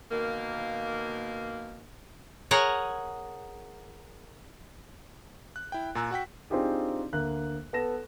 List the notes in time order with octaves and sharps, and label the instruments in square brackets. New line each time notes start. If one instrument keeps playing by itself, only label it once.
[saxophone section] B2 D#3 A#3
[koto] G#4 A#4 C#5 F#5 G#5 A#5
[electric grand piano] F#6
E4 G5
A#2 G#5 A#5 E6 F#6
F#4 F#5 G5 B6
[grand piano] C4 D4 D#4 F4 G4 G#4
D2 A#3 F#6
B3 A4 A5 A#6 E7